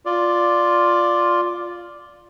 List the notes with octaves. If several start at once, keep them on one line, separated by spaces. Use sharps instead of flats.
F4 D5